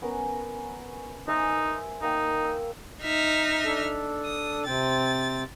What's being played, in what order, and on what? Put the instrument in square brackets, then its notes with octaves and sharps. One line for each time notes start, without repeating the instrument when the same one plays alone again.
[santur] B3 C#4 A#4
[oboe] D#4 [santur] C5 E5 G#5
[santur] A#3 G5 [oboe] D#4
[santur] E6
[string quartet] D#4 E5 F6
[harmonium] D4 A4
[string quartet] D#6
[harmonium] C3 C4 G5 [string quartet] A6